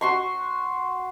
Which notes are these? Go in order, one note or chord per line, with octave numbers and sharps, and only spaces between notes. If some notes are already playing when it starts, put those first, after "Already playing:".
F#4 C6 C#6